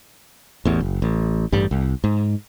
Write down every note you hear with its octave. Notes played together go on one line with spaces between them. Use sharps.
A1 E2
F#1
A1
A1 G2 G3
C2
G#2